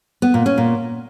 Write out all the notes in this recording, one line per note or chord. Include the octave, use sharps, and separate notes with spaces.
B3
A#2
C#4
A#2